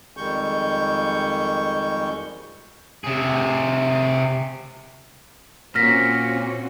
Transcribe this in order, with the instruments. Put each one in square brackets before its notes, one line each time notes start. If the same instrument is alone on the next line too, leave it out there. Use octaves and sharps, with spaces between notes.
[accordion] F2 D#3 G3 G#3 C#6 G6
[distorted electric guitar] C3 G#4
[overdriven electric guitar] A#2 [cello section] C4 C#4 F#4 [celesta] F6 A#6 B6